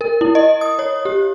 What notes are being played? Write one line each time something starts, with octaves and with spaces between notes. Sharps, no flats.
A#4
E4
D#5
D#6
C#5
G4